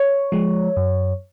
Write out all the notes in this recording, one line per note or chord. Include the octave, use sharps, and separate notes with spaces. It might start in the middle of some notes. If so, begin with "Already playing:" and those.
Already playing: C#5
F3 G#3
F#2